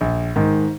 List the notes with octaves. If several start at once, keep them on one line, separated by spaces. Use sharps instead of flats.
A#1
G#2 D#3